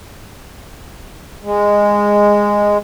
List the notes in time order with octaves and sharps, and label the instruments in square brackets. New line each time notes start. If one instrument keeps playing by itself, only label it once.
[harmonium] G#3